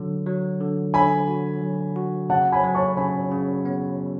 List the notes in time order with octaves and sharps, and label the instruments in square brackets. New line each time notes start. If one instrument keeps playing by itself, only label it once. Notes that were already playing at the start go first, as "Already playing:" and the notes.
Already playing: [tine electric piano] D3 F#3
F#3
D3
[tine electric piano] D3 [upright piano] G#5 B5
[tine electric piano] F#4
F#3
F#4
[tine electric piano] C#3 [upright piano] F#5 A5
[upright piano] G#5 B5
[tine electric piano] F#3
[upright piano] A5 C#6
[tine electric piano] C#3 [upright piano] G#5 B5
[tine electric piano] C#3
B3